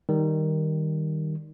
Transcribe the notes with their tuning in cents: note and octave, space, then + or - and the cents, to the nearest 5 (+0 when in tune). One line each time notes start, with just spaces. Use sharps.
D#3 +0 G3 +0